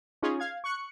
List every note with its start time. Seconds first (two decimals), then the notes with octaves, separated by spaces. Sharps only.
0.22 C#4 D#4 F4 G#4
0.40 F5 G#6
0.64 C#6 F#6 C#7